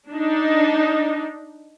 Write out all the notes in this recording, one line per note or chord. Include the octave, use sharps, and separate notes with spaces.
D4 D#4